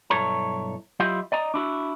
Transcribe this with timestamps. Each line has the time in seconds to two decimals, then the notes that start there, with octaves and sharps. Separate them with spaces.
0.10 B1 G2 E4 A4 C#5 A#5
1.00 F#3 E4 F4 G4 D#5 F5
1.32 D5 D#5 A#5
1.54 D4 E4 F#4